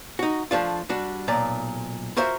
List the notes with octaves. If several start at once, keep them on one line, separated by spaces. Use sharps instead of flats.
D#4 F#4
F3 A3 D4 F4
G3 D4 F#4
B1 A#2 D5 A#5
F4 F#4 A#4 C5 E5